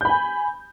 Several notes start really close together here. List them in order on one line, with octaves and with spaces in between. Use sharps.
G6 B5 G#5